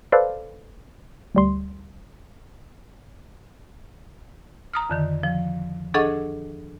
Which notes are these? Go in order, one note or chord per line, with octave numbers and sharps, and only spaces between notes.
A4 B4 C5 D5 F5
D2 G3 C6
A#5 D#6 F6
F2 D3 D#3
F3
D4 G#4 A4 D#5 F#5 C#6